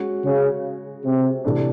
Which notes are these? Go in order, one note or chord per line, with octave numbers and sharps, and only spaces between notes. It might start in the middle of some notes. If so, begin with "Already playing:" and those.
Already playing: G#3 C#4 F#4
C#3
C3
C3 E3 A3 D4